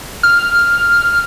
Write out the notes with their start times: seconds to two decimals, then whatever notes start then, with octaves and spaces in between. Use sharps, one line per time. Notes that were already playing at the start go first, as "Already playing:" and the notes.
0.23 F6